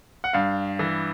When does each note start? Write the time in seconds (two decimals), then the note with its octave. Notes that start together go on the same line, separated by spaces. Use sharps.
0.24 F#5
0.33 G2 F5
0.79 E3